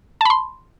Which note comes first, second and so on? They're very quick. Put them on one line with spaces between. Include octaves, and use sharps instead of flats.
A5 B5 C6